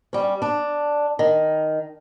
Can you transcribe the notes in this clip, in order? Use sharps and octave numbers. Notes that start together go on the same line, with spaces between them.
G3 C#4
D4
D#3